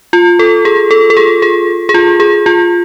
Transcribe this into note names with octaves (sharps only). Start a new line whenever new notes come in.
F4
A4
G#4
A4
A4
G#4
G#4
G#4
F4
G#4
F4